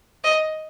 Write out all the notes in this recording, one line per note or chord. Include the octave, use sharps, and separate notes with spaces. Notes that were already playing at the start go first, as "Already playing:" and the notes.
D#5